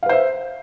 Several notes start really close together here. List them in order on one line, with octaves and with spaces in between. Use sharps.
F5 B4 C5 E5